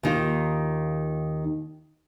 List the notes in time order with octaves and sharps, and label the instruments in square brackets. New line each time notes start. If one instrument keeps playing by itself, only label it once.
[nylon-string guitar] D#2 D#3 F4